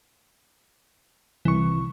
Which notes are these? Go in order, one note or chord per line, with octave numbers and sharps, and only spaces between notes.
C2 E3 C#6